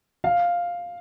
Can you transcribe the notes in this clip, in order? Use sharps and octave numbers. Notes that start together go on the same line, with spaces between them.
F5